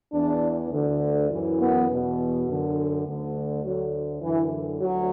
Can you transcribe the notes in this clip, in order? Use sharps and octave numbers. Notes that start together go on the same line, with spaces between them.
E2 E3 D4
D2 D3
F#2 E3
B3
E2 B2
F#2 D3
D2 D3
D2 D3 F#3
F#2 D3 E3
D2 F#3